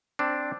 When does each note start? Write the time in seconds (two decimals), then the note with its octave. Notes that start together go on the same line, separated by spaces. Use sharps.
0.19 C4 D4